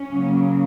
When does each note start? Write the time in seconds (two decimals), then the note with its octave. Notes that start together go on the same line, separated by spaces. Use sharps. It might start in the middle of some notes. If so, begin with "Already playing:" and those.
Already playing: C#4
0.11 C#3 F#3 A#3